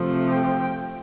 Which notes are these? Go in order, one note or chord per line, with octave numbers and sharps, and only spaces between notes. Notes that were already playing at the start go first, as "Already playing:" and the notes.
Already playing: C3 F3 A3
G5